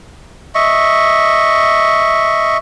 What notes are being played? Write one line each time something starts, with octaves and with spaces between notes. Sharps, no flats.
D#5 E5 C#6